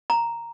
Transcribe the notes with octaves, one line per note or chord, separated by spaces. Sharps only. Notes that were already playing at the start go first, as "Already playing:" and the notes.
A#5